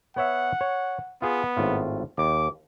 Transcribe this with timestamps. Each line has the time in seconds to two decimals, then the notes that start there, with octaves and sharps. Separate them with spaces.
0.16 B3 C#5 E5 F#5
0.61 C#5
1.22 B3 F4 G#4
1.57 G#1 A2 F4
2.18 D#2 D6